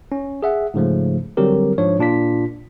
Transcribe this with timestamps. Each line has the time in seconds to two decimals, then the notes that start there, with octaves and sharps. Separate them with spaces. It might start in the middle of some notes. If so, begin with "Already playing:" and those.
0.12 C#4
0.43 G#4 E5 F#5
0.74 G#2 C#3 F3 A3
1.37 D3 F#3 G3 C4 G4 A#4
1.78 G#2 F3 D4 C#5
1.99 A#2 D4 F4 B6